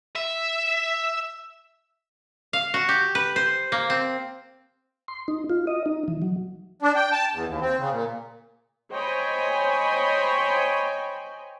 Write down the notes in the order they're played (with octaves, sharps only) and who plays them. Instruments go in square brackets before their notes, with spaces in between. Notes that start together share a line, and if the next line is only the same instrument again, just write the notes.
[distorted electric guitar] E5
[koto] F5
F#4
G4
B4
C5
A#3
C4
[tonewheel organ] C6
D#4
F4
D#5
D#4
E3
F#3
[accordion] D4
G5
A5
E2
D#2
C4
C#3
A#2
[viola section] C5 C#5 D#5 G5 G#5 B5